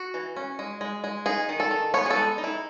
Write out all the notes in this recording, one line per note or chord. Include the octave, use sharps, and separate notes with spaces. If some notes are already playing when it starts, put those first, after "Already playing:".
Already playing: F#4
E3
C#4
G#3
G#3
G#3
D#4 G#4
D#3
A4
D#3
B3 C#5
G#4
A4
G#3
D#4
E4